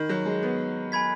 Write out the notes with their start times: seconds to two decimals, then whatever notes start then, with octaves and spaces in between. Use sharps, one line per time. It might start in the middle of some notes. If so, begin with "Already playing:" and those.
Already playing: D#3 B5
0.09 F#3
0.26 G#3
0.42 B3
0.92 G#5 B5 G#6 B6